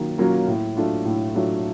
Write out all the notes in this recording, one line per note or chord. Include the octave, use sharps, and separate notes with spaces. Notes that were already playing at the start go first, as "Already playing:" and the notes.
Already playing: D#3 F#3 A#3 C#4 F4
F#3 A#3 C#4 F4
A2
F#3 A3 D4 F4
A2
F#3 A3 D4 F4